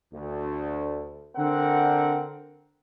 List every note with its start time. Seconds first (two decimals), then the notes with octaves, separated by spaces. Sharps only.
0.14 D2
1.36 D3 C4 A#4 F#5